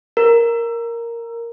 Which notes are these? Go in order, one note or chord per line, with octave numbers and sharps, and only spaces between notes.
A#4